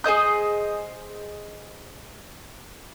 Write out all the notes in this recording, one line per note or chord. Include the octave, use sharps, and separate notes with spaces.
G#4 C5 D#5 G6